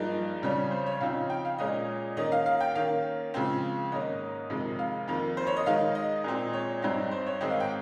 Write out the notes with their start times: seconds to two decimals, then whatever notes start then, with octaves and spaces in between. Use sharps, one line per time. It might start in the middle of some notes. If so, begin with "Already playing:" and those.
Already playing: G2 F3 A#3 D#4 G#4
0.42 F2 C#3 G3 C#4
0.71 C5
0.86 C#5
1.00 C#3 F3 C4 D#4 F5
1.30 G5
1.45 F5
1.58 A#2 G#3 C#4 D#5
2.17 D#3 A#3 C#4 D#5
2.32 F5
2.46 F5
2.60 G5
2.75 D#3 A#3 C#4 F5
3.34 C#3 F3 G#3 C4
3.91 G#2 D#3 A#3 C#4 D#5
4.50 F2 C3 D#3 G#3
4.79 F5
5.08 F2 D#3 A#3
5.37 C5
5.47 C#5
5.57 D#5
5.66 D#3 G#3 D#4 F5
5.95 D#5
6.24 A#2 G#3 C4
6.53 C#5
6.82 G2 G3 C4 D#4
7.11 C5
7.26 C#5
7.41 G#2 D#3 G#3 C4 D#5
7.50 F5
7.60 G5